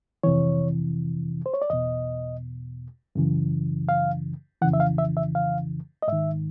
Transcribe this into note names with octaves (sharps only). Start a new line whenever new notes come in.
F2 C3 E3 C#5
C5
C#5
D5
E2 B2 D#5
F#2 C#3 E3
F5
F2 C#3 E3 F#5
E5
F5
E5
E5
F5
D#5
G#2 D#3 E5